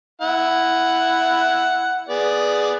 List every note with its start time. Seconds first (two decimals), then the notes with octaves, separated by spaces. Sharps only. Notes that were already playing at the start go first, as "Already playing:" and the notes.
0.21 E4 F#5
2.09 B3 G#4 D5